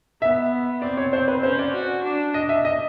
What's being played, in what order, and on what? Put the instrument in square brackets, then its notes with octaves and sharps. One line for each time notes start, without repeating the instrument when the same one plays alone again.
[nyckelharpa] B3 [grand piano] E5
[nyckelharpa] C4 [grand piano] D5
[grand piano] C#5
[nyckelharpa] C4 [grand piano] C5
[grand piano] B4
[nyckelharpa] C#4 [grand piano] C5
[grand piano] D5
[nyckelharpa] F#4
D4
[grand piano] D#5
E5
D#5